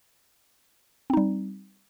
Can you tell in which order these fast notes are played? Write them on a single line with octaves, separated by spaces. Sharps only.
C4 D#4 G3